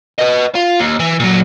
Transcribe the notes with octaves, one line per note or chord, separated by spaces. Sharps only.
B4 D#5
F4
D#2
E3
A#2 F#3